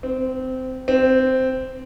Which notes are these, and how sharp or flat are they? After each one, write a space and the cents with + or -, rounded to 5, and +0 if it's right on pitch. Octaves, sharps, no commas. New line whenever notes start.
C4 -20
C4 -10